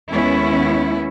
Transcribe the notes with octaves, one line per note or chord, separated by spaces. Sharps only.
D#2 G#3 B3 C#4 E4